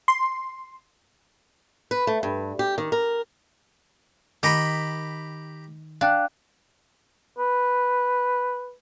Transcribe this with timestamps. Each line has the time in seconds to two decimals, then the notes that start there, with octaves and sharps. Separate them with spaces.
0.08 C6
1.91 B4
2.07 A3
2.23 G2
2.59 G4
2.78 D#3
2.92 A#4
4.43 D#3 G4 A#5 B5
6.01 D4 F5 G5 F#6
7.39 B4